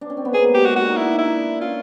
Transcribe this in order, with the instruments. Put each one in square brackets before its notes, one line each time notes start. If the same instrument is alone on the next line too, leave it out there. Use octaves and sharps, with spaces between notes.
[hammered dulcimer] D4
C#4
C4
B3
[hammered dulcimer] A#3 [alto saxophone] G#4
[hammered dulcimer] G#3
[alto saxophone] G4
[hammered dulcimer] G#3 [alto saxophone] F#4
[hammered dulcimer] D4 [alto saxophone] F#4
[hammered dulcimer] D#4
[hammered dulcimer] D4 [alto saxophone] E4
[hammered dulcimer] D#4
[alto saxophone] E4
[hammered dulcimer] D4
[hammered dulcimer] C#4 [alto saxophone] F4